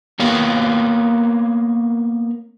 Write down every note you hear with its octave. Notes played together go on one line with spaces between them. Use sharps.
A#3 B3 A#4 C#5 F5